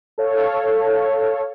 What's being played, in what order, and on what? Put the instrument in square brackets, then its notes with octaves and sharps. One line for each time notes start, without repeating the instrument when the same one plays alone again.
[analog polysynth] A4 C#5 F5